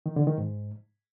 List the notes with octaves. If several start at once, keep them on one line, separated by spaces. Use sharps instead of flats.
D#3
D3
D#3
G#2